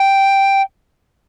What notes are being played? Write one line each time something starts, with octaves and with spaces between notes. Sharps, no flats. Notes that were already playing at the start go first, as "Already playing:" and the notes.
Already playing: G5